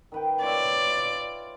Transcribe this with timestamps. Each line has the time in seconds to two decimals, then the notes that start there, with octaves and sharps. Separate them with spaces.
0.12 D#3 B4 G5
0.43 F4 C#5 D5 E5